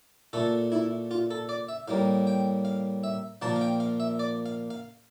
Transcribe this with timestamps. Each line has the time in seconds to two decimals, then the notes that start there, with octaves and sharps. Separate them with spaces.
0.33 A#2 A3 A4
0.72 E4
1.11 F4
1.31 A4
1.49 D5
1.69 E5
1.88 A2 G3 A#3 F5
2.27 G5
2.65 F5
3.04 E5
3.42 A#2 F3 A#3 A5
3.56 F5
3.61 G5
3.80 F5
4.00 E5
4.19 D5
4.46 F5
4.70 F5